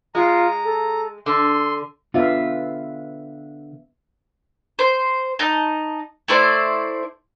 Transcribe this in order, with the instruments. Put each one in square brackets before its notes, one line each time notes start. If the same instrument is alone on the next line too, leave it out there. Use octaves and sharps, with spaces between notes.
[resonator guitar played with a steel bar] G#3 [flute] F4 [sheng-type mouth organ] A#5
[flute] A4
[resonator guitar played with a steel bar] D3 [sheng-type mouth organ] C6 [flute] E6
[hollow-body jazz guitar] D3 F4 [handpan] B3 E5 F5
[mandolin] C5
D#4 A5
A3 E4 C5 D5